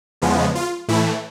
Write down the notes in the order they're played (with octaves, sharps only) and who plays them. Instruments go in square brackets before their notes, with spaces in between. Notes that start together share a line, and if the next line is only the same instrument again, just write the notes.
[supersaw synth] E2 C#3 F3 G#3 B3
F4
A2 E3 A3 E4